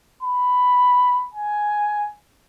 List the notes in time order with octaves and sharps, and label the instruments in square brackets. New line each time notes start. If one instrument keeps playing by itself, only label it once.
[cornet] B5
G#5